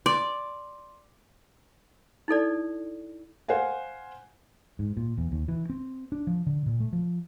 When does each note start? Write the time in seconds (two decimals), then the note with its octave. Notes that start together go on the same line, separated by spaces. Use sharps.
0.06 D5 C6
2.28 D#4 E4 A4 D5
3.48 C5 F5 F#5 G#5
4.79 G#2
4.97 A#2
5.18 E2
5.32 D#2
5.48 E3
5.70 C4
6.12 D4
6.27 F3
6.47 D3
6.66 A#2
6.80 A3
6.93 F3